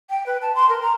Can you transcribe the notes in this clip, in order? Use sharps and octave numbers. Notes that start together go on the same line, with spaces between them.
G5
B4
A5
C6
A#4
A#5